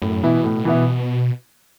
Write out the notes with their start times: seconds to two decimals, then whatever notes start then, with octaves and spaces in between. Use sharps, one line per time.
0.02 F#2 A2
0.23 B2 E3 B3 E4
0.44 A2
0.65 E3 B3 E4